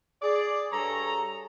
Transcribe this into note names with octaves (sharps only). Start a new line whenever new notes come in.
G#4 D5
G2 G#4 A4 C#5 A#5